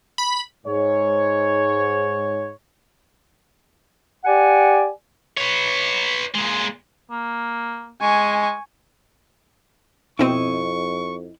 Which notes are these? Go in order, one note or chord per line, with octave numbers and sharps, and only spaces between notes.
B5
G#2 C#5
G4 D5 F#5 G#5
B4 C#5
A#2 G#3
A#3
G#3 G#5 C#6
F2 B2 C4 E4 D#5 C#6